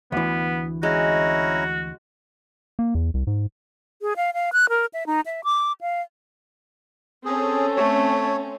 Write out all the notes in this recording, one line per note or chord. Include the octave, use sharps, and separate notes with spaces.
D2 E3 B3
G#3 C#4 E4 F#4 A#5
A#3
E2
C2
G#2
G#4
F5
F5
F#6
A#4
E5
D#4
E5
D6
F5
C4 C#4 G#4 A4
A3 C#5